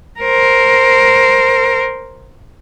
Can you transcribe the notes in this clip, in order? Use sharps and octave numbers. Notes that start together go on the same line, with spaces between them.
A#4 C5